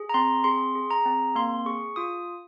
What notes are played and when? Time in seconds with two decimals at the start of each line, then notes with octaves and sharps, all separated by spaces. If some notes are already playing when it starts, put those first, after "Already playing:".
Already playing: G#4
0.09 A#5
0.14 C4 C6
0.44 G#4 C6
0.75 G#4
0.90 A#5
1.05 C4
1.35 A#3 C6
1.66 G#4 C#6
1.96 F4 D#6